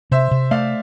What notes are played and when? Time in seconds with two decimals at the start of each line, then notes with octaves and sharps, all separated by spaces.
0.11 C3 C5 E5
0.31 C3
0.51 A3 D5 F5